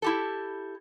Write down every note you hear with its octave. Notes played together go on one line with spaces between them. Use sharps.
E4 G4 A4